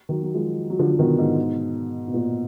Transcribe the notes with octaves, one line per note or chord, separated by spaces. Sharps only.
D#3 F#3
F#3
F3 G#3
F#3
D3 F3
F3
B2 D#3
G#2 B2
B2
A#2